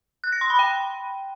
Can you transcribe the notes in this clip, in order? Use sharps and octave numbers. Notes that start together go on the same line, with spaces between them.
F#6
A#6
C6
B5
G5